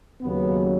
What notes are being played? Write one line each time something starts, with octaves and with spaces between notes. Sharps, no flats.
D#2 C#3 F#3 B3